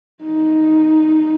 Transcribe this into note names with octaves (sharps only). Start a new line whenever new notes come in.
D#4